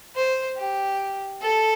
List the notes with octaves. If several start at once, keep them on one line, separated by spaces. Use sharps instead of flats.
C5
G4
A4